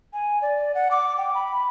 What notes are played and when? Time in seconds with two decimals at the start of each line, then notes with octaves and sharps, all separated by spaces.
0.13 G#5
0.42 D5
0.75 F#5
0.91 D6
1.18 G5
1.35 B5